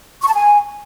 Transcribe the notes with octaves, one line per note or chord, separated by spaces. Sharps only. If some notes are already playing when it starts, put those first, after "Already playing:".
C#6
A5
G#5